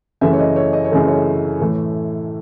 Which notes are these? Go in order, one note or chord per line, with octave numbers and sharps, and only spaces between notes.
F#2 C#3 E3 A3 E5
C#5
D#5
C#5
D#5
C#5
F#2 C#3 E3 A3
C#5
A2 E3 A3